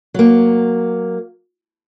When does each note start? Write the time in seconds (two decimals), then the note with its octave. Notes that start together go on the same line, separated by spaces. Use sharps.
0.14 F#3 A#3